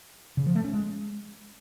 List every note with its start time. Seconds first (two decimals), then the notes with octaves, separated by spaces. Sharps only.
0.37 C#3
0.46 F3
0.55 A3
0.64 C#4
0.73 G#3